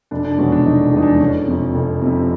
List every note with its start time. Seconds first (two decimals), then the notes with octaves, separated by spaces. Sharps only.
0.11 F1 D4
0.25 D4
0.38 E2 B2 G#3 C#4
0.52 D4
0.66 F1 D#4
0.93 E2 B2 G#3 D#4
1.02 D4
1.15 D4
1.20 F1 C#4
1.47 F2 C3
1.75 F1
2.02 F2 C3